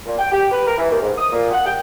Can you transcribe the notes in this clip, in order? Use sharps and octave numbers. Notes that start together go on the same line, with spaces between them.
A#2
G5
G4
B4
A#4
E3
D#2
G#2
D#6
A#2
F#5
G5